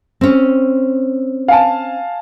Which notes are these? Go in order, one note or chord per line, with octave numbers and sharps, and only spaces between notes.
C4 C#4
F5 G#5 A5